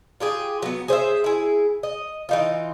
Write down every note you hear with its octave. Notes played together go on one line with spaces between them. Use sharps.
F4 G4 G#4
F#3 B3
G#4 C5 D#5 E5
E4 G#4
D#5
E3 D#4 F4